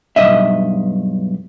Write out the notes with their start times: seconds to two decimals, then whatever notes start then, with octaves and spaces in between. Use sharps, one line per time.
0.16 B1 G2 D#5 E5